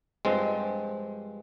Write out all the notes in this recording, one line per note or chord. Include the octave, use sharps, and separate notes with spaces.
G2 F3 G#3 C4